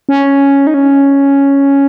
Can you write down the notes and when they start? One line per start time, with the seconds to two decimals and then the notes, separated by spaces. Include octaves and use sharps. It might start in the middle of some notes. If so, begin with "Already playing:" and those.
0.09 C#4
0.67 D#4
0.74 C#4